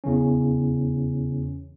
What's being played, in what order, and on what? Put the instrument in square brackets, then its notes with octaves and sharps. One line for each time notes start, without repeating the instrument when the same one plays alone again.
[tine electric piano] E2 C#3 E3 C#4